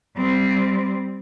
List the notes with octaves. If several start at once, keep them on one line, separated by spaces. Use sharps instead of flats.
G3 C4